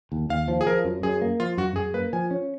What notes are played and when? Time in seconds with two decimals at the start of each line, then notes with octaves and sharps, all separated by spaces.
0.12 D#2
0.29 D#2 F5
0.48 F3
0.61 G#4
0.66 F3 A#4
0.85 F#2
1.03 F#2 G#4
1.22 A#3
1.40 F3 F4
1.57 F#2 F#4
1.76 F#2 G#4
1.94 A#3 B4
2.13 F3 G#5
2.31 C#4